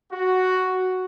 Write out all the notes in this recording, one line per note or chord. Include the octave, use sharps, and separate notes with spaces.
F#4